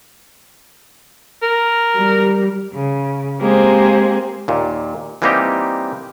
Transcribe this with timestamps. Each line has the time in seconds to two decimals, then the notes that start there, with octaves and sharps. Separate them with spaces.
1.42 A#4
1.96 G3
2.73 C#3
3.40 G#3 A#3 C4 G4 G#4 C5
4.48 D#2 A#2
5.22 E3 G3 A#3 C4 D#4 G4